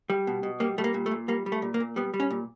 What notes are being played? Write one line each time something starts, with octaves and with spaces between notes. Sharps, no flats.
G3
B2
B2
G3 A#3
G3 A3
A#3
A#2
A3
A#2
G3 A#3
G3
A3
A#2
A#3
A#2
G3 B3
G3
C#4
A#2